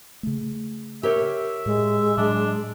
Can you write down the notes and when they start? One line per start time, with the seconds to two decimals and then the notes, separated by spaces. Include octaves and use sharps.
0.23 C#3 A3
1.03 G4 A#4 C#5 E5
1.66 A2 G#3
2.17 A2 F#3 D4